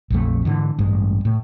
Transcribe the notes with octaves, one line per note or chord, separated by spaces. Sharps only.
A#1 F2 A3
G#2 D3 E3
A1 G2 G#3
A2